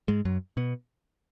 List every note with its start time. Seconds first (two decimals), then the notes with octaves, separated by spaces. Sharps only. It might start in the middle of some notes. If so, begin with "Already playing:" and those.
0.08 G#2 G#3
0.25 F#2 F#3
0.57 B2 B3